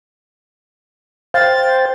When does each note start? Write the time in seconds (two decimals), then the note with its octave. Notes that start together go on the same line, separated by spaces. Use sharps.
1.34 C5 F5 G5 A6